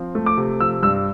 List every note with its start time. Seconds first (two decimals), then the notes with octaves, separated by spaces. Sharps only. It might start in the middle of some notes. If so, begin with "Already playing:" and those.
Already playing: F3 C4
0.15 A3
0.26 D6
0.37 C3
0.60 F3 E6
0.83 G2 E6